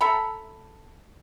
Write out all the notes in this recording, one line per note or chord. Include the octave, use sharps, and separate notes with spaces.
A4 E5 A#5 B5